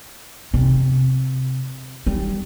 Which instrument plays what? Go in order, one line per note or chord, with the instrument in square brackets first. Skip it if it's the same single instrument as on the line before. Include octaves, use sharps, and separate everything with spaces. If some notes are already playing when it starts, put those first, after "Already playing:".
[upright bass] C3
G3